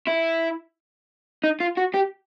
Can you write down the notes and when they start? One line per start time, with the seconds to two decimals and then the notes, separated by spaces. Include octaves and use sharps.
0.08 E4
1.44 D#4
1.60 F4
1.77 F#4
1.94 G4